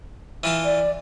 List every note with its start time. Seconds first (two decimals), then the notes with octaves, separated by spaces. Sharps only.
0.43 E3 F4 A5
0.65 D5